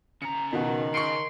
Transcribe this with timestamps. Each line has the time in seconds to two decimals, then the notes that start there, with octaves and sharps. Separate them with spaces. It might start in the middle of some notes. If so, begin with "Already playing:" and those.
0.22 C#3 A#5 C#7
0.53 B2 D#3 F#4
0.94 C#3 C6 C#6 C#7 D7